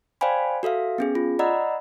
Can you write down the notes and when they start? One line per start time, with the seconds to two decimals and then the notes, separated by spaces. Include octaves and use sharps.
0.21 C5 D5 F5 G5 G#5 B5
0.63 F#4 A4 E5 F5
0.98 B3 C#4 G#4
1.15 F4
1.39 D5 D#5 F#5 A#5 B5 E6